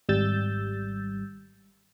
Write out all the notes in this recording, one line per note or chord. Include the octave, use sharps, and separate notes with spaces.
G#1 G3 E6 G6 A6